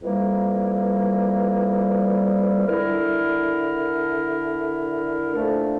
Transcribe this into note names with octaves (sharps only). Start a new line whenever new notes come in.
F2 E3 G3 A#3
D3 A3 E4 A#4
A#2 F3 A3 D4 A4